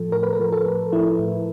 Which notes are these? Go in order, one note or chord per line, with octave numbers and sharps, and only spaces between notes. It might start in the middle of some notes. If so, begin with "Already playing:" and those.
Already playing: A2 F3 A4
A2 A#4
B4
A#4
F3
A4
A2
F3 E4
A2